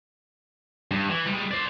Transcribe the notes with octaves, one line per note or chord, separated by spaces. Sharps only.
G2
E3
G3 G#3
C5 D5